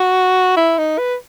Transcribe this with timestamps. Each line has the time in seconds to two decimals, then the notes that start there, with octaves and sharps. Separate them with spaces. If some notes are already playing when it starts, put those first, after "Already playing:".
Already playing: F#4
0.57 E4
0.78 D#4
0.98 B4